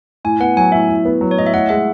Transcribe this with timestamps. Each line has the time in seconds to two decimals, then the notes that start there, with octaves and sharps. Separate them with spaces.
0.25 A2 G#5
0.40 B3 F#5
0.57 F#3 G#5
0.72 A2 E5
0.89 A2
1.05 B3
1.21 F#3
1.31 C#5
1.37 A2 D#5
1.46 E5
1.53 A2 F#5
1.69 G#3 E5